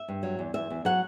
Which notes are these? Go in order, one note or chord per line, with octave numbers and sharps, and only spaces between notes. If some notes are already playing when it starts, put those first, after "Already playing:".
Already playing: E5
G2
F#3
E2
E2 E5
E2
F#3 F#5